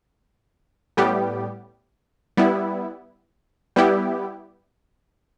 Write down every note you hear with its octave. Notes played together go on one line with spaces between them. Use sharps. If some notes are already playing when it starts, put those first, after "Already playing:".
A2 G3 B3 G4
G3 B3 E4
G3 B3 E4 G4